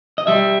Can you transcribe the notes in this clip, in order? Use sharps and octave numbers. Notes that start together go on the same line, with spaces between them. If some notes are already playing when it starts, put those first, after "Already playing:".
D#5
G3 E5